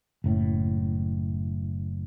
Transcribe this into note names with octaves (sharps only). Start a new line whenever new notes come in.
F#1 A2